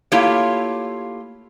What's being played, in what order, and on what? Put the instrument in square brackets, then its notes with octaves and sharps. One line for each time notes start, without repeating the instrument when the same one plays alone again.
[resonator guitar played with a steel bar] A3 A#3 E4 F4 G4 C#5